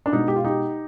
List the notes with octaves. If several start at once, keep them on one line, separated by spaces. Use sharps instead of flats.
D4
B2 G#3 D#4
G4
F4
D#4 G4